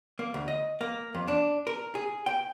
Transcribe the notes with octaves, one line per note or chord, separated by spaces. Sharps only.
A#3
D2
D#5
A#3
F2
D4
A#4
G#4
G5